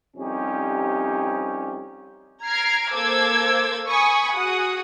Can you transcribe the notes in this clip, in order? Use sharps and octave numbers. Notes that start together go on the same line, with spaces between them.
C2 F2 C3 C#4 D#4 G4
A#5 F6 G#6 C7 D7
A#3 A4 C5 D6 E6 G#6
G#5 B5 C#6 D#6
F#4 G#4 F#5 D#6